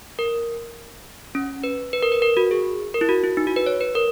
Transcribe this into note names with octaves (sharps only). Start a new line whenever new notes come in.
A#4
C#4
B4
B4
A#4
B4
A#4
F#4
G#4
A#4
E4
F#4
E4
D#4
F#4
B4
C#5
B4
A#4